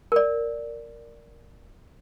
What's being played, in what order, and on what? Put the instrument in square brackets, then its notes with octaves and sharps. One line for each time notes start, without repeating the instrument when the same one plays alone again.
[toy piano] A#4 D5